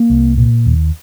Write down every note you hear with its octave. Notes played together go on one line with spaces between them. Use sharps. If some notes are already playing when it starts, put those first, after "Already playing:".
Already playing: A#3
C2
A#2
D#2